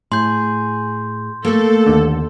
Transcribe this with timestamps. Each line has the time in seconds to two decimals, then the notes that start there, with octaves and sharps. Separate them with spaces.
0.12 A2 G#4 C6 G6
1.45 A3 A#3 A4
1.86 D#2 D3